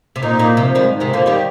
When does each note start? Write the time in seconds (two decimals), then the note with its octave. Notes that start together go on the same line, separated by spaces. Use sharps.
0.16 C3
0.23 A#2 D#4
0.39 A#2 A#3
0.57 C3 F3
0.75 G#2 D#3 G3
0.92 G#2
1.00 C3 D#3
1.10 D3 F3 A#3
1.26 D#3 G3 G4